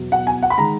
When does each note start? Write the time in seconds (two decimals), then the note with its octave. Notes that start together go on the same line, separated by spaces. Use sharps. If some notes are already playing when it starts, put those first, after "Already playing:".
Already playing: E2 B2 F#3
0.12 F#5
0.27 G#5
0.43 F#5
0.50 B5
0.58 D#3 G#3 A#5